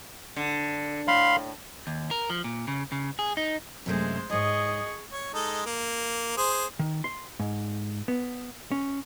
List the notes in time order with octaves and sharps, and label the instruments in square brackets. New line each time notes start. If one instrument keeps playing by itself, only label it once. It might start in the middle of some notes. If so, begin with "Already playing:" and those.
[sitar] D3
[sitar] A2 [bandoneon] F5 B5 C6
[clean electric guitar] D#2
A#4
F3
A#2
C#3
C#3
G#4
D#4
[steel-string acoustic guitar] F#2 C3 A3 [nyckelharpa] G#3 C5
[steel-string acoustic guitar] G#2 C#5 [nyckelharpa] G#4 C#6 [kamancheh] D#5
[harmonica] C#5
G#3 D#4 A4
A#3
G#4 C5
[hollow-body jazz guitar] D#3
C6
G#2
B3
C#4